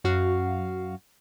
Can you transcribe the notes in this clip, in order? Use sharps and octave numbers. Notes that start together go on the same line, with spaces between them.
F#2 F#4 F5